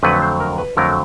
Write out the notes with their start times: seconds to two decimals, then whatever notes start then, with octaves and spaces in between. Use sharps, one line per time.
0.02 F2 D3 F#3 A3 B4
0.22 C5
0.40 A#4
0.58 B4
0.77 F2 D3 F#3 A3 A#4